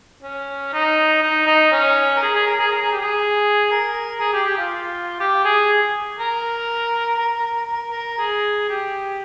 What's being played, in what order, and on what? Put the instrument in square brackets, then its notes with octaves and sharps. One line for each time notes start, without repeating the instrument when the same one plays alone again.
[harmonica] C#4
D#4
D#4
D#4
C#4
A#4
G#4
G#4
A#4
G#4
A#4
G#4
G4
G#4
A#4
G#4
G4
G4
F4
G4
G#4
A#4
A#4
A#4
A#4
A#4
A#4
G#4
G4